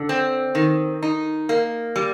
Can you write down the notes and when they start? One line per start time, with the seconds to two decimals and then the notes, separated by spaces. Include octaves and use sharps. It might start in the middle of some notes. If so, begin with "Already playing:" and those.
Already playing: D3
0.09 C4
0.55 D#3
1.03 D#4
1.49 A#3
1.96 G3